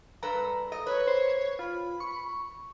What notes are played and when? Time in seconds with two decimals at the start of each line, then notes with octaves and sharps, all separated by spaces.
0.23 G2 A4 B4 A#5
0.72 D#5
0.87 B4 C#5
1.07 C5
1.59 F4 B5
2.00 C#6